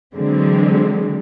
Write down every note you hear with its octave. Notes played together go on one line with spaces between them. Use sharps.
D3 E3 F#3 G#3 C4